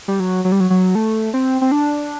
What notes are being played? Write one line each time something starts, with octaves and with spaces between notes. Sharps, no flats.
G3
F#3
F#3
G3
F#3
F#3
A3
C4
C4
D4